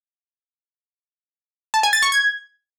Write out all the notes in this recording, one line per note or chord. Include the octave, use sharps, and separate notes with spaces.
A5
G#5
A6
C#6
G#6